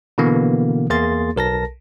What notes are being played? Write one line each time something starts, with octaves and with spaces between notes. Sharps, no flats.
B2 D3 E3 A#3 B3
E2 A#3 G#4 C6 A6
B1 A#4 A5 A#6